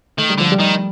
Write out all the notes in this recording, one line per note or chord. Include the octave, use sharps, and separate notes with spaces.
D#3 A3
G3
D3 F3
G3
D#3